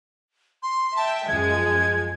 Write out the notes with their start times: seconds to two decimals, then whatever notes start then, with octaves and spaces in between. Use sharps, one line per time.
0.63 C6
0.96 E5 G5 A5
1.28 F#2 F3 G#3 G#6